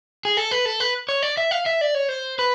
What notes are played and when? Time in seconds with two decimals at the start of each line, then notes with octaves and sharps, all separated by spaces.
0.25 G#4
0.37 A4
0.51 B4
0.65 A4
0.80 B4
1.09 C#5
1.23 D5
1.37 E5
1.51 F5
1.66 E5
1.81 D5
1.95 C#5
2.09 C5
2.39 B4